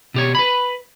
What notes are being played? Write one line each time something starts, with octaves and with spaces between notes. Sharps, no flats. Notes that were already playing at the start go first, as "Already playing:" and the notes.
B2 G4 C#5
B4 B5